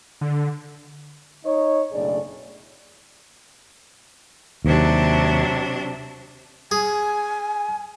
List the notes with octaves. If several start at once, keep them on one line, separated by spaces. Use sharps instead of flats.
D3
D#4 C#5 D#5
F#1 B1 A2 D4 G#4 D5
D#2 C3 F#3 D4
G#4 G#5